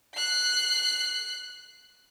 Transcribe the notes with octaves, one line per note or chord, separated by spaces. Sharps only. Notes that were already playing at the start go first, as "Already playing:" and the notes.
F#6 C7